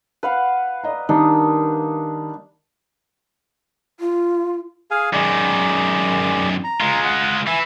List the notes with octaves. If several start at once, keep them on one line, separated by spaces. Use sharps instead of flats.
B4 F5 F#5
D5 D#5 A#5
D#3 G3 A#3 D4 D#4 D#6
F4
G#4 F5 G#5
F#2 D#3 G#3 D5
A#5
G#3 F4
F#5
E3 E5 G#5